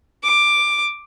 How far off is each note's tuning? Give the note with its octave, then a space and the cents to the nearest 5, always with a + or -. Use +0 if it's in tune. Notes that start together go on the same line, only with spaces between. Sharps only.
D6 +10